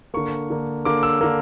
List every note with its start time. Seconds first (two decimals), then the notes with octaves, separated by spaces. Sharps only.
0.14 D3 A#3 C#6
0.50 D3 A#3
0.85 D3 A#3 D6
1.03 E6
1.21 D3 A#3